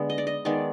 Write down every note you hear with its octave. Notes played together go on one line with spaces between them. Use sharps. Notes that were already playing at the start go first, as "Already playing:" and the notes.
Already playing: D3 G#3 B3
D#5
D5
D#5
D#3 G#3 B3 D5